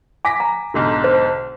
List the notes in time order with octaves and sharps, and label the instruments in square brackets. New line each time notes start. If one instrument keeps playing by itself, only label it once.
[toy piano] G#5 [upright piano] D6 A#6 B6
[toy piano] A#5
[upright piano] B1 G#2 D3
[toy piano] C5